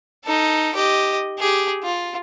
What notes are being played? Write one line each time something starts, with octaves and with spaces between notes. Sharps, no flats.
D#4 A4
G4 D#5
G4 G#4
F4